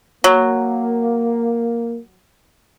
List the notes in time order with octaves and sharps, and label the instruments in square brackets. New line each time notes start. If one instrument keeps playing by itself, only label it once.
[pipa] F#3 [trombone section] A#3